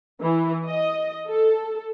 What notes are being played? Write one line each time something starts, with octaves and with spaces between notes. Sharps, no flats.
E3
D#5
A4